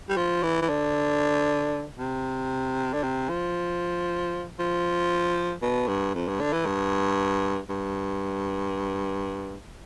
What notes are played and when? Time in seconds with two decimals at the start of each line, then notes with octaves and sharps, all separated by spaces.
0.09 G3
0.17 F3
0.43 E3
0.62 E3
0.69 D3
1.99 C3
2.93 D3
3.03 C3
3.29 F3
4.59 F3
5.62 B2
5.88 G2
6.15 F2
6.28 G2
6.40 D3
6.53 E3
6.66 G2
7.70 G2